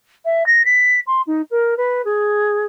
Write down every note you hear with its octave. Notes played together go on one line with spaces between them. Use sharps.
E5
A#6
B6
C6
D#4
A#4
B4
G#4